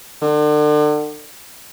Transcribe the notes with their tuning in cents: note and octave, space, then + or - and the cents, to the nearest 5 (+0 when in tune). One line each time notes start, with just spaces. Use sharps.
D3 +35